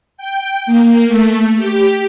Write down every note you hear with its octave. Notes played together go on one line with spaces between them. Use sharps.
G5
A#3
A3
G4